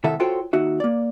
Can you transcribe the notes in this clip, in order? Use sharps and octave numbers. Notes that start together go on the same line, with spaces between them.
A2 C3 D#3 A4 E5 F#5
F4 F#4 A4 C5 C#5 G5
D#2 D#4 F#4 E5
A#3 D5